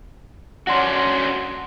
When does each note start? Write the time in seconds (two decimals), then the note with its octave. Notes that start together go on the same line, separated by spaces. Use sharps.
0.67 C#4 D4 F#4 F#5 C6